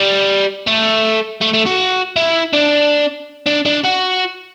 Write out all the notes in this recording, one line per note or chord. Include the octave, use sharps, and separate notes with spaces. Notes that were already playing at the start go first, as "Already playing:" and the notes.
Already playing: G3
A3
A3
A3
F#4
E4
D4
D4
D4
F#4